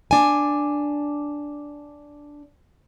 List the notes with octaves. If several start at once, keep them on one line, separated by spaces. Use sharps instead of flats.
D4 G#5